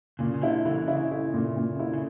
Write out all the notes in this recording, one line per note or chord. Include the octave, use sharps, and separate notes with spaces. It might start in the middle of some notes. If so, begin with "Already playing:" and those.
A#2 C#3
C#3
D3 E4
C#3 E3 E4
C#3 E4
E4
A#2
A#2
E4
C#3